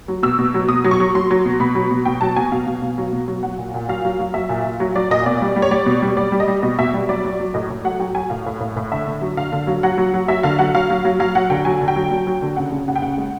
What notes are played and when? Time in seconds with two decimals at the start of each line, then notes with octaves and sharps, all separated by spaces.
0.08 F#3
0.23 B2 E6
0.39 B2
0.54 F#3
0.68 B2 D#6
0.84 F#3
0.91 C#6
1.00 F#3
1.15 F#3 C6
1.30 F#3
1.45 B2
1.60 B2 B5
1.75 F#3
1.91 B2
2.05 B2 G5
2.21 F#3 A5
2.36 B2 G#5
2.52 B2 F5
2.67 B2
2.82 B2
2.98 F#3
3.13 B2
3.28 F#3
3.43 F#3 F#5
3.58 A#2
3.74 A#2
3.88 F#3 F5
4.05 F#3
4.19 F#3
4.34 F#3 E5
4.49 A#2
4.65 A#2
4.80 F#3
4.95 F#3 D5
5.10 A#2 D#5
5.26 B2 D5
5.42 G3
5.56 G3
5.62 C#5
5.71 G3 D5
5.86 B2
6.02 G3
6.17 G3 D5
6.32 G3
6.40 D#5
6.48 G3
6.62 B2 D#5
6.79 B2 E5
6.94 G3
7.09 F#3 D5
7.24 F#3
7.40 F#3
7.54 A2 D#5
7.70 A2
7.84 F#3 F#5
8.00 F#3 G5
8.15 F#3 G#5
8.30 A2 F5
8.46 A2
8.61 A2
8.76 A2
8.92 D3 E5
9.06 D3
9.22 F#3
9.37 D3 F5
9.52 D3
9.67 F#3
9.83 F#3 F#5
9.98 F#3
10.14 F#3
10.28 F#3 E5
10.43 D3 F5
10.59 F#3 F#5
10.75 F#3 F5
10.90 F#3
11.05 F#3
11.20 F#3 F5
11.35 F#3 F#5
11.50 D3 G5
11.65 F#3 G#5
11.81 D3
11.88 G5
11.96 F#3
12.11 F#3
12.27 F#3
12.42 D3
12.57 C#3 F#5
12.72 C#3
12.88 C#3 F#5
12.96 G5
13.02 C#3 F#5
13.18 G#3